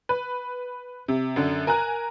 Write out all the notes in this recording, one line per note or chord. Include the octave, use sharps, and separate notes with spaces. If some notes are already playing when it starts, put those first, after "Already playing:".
B4
C3
F#2 D3
A#4 G#5 A#5 F#6